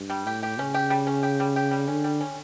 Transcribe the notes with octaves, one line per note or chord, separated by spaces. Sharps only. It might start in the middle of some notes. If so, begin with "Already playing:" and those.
Already playing: G2
G3
A2 G4
G4
C#3 C#4
G4
G3
C#4
G4
G3
G4
G3
D3 C#4
G3
C#4